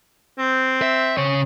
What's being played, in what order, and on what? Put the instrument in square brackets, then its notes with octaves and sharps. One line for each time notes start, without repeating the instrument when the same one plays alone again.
[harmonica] C4
[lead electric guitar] E5
C#3 C#5